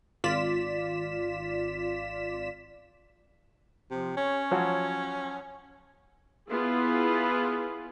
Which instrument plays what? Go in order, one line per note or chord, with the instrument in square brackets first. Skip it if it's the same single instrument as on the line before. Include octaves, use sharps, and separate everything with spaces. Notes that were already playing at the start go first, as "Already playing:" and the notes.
[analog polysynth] G#1 F4 D5 B6 E7
[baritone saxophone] C3 [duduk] F3
[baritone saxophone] C#4 [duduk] C#5
[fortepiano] F3 F#3 F#4
[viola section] B3 E4 F4 G#4 B4